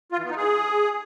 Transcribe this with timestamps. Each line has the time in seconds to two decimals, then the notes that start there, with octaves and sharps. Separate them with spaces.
0.12 F4
0.18 E3
0.24 B3
0.31 D#4
0.37 G#4